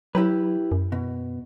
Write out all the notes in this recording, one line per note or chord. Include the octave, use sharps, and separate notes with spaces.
F#3 E4 G4 B4
F#2
B2